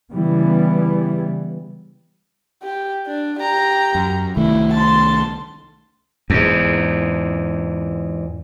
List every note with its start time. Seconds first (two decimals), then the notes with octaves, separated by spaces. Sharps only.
0.12 C#3 E3 G3 B3
2.63 G4
3.06 D4
3.39 G4 A#5
3.95 F#2
4.37 C2 D#3 A3 E4
4.73 A5 C6
6.30 E2 G#2